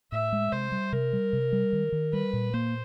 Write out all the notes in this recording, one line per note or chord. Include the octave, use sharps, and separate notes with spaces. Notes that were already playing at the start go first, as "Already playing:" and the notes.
A2 E5
G#3
C3 C5
G3
C3 A#4
G3
C3
G3
D#3
D#3
G3 B4
A#2
A#3 C5